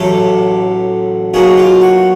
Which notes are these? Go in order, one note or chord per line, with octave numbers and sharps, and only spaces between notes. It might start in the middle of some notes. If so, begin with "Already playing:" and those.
Already playing: A1 A2 F#3 G4 A4
B1 B2 F#3 A#3 F#4 G#4
F4 G4
F#4